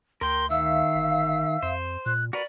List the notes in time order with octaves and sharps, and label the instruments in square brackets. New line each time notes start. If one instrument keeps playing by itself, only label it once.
[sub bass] D2 [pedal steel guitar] A#4 G5 [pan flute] C6
[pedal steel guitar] D#3 [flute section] E5 F5 [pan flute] E6
[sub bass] G1
[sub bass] F2 [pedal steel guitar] C5
[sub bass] A#2 [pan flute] F#6
[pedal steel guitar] F#4 A#4 B4 [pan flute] D5